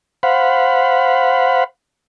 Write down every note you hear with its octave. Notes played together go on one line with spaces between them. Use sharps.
C5 F5 F#5 B5